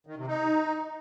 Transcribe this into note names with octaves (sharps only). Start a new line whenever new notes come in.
D#3
C3
D#4